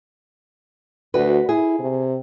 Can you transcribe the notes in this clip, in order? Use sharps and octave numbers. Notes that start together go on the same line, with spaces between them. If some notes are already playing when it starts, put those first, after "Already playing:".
D2 F#4 B4
E4 G#4
C3